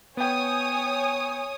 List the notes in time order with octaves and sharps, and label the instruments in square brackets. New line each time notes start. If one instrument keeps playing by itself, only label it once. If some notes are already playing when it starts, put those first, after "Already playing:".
[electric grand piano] B3 G5 [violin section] C#5 G#5 D#6